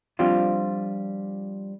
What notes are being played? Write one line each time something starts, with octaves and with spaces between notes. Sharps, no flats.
F3 G3 C4 D4 F4